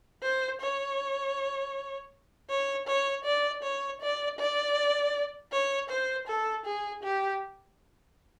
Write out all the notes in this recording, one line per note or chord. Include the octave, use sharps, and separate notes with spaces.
C5
C#5
C#5
C#5
D5
C#5
D5
D5
C#5
C5
A4
G#4
G4